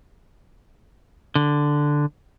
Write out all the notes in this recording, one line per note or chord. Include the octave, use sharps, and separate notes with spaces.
D3